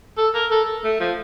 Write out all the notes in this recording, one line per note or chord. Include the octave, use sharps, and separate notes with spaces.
A4
A#4
A4
A3
F3